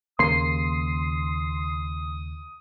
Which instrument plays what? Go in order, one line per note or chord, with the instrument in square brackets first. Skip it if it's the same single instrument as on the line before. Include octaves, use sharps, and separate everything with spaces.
[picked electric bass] D#2 C#3 A#3 [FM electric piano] C6 C7 [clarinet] D#6